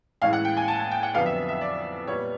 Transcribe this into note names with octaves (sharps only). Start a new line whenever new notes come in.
A2 E3 G#3 C#4 E4 F5
F#5
G5
G#5
A5
A5
G5
F#5
F2 D3 F#3 B3 F5
E5
E5
D5
A#2 G3 B3 C#5